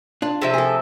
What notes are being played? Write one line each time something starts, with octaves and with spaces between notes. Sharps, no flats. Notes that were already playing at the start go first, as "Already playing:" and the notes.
D4 F4
C3 F3 E5
G#4 A4